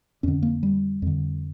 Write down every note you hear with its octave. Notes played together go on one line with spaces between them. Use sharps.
F2 D3 C#4
A#3
G3
F2 D3